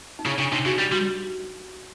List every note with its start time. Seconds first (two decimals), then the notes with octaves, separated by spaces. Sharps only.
0.19 D#4
0.26 C#3 E4
0.39 C#3 D4
0.52 C3 D#4
0.66 C#3 F#4
0.79 G3 G4
0.92 G3 F#4